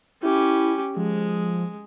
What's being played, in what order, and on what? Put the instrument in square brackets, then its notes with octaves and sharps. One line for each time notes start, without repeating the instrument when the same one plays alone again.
[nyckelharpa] C#4 G4 [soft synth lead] E4
[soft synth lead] F3 [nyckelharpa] G#3